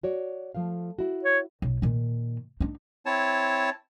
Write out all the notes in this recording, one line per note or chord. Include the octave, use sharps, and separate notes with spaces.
F#4 C#5 D5
F3 A3 F5
E4 F#4
C#5
B1
A#2 D#3
D4 D#4
C4 E4 C#5 A5